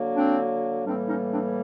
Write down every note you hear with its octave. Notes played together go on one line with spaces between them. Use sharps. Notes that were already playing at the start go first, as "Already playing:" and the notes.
Already playing: D3 F#3 A#3
C4 D4
A2 E3 G3 A#3 C4 D4
C#4 D#4
C4 D4